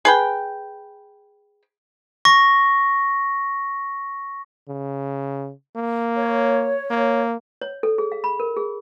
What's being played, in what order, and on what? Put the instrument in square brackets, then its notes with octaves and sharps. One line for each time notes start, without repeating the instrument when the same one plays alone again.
[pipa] G#4 B4 G5
[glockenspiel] C#6 A#6
[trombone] C#3
A#3
[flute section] C#5
[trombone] A#3
[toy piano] C#5
A4
G#4
F5
B5
A#4
G#4